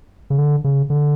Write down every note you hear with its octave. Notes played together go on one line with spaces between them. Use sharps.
C#3
D3
C#3
D3